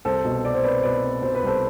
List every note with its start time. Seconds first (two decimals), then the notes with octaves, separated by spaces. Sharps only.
0.05 C2 A4 C5
0.25 B2
0.44 C4 D5
0.55 C5
0.64 C4 B4 D5
0.77 C5
0.83 B2 B4 D5
1.03 C4
1.22 B2 C5
1.34 B4
1.42 C2 A4 C5